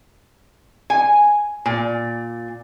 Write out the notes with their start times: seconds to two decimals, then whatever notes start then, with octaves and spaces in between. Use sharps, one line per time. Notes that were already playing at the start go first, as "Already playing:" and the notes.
0.90 G#5
1.66 A#2